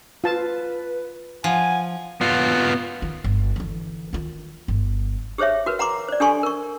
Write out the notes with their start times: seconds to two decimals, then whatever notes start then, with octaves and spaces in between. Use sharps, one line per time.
0.24 F4 B4 A5
1.44 F3 F#5 G#5
2.21 B3 F4
3.02 D#3
3.24 G1
3.56 D3 E3
4.13 D#3 F4
4.68 G1
5.38 G4 G#4 C5 C#5 E5
5.66 F#4 A#4 B4
5.79 F#5 A#5 C6 D6
6.08 C5 D5
6.20 D4 G4 A4 G#5 C6 C#6
6.43 A#4 C#6